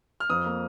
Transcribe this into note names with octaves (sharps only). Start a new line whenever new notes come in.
F6
F2 D#6
A#3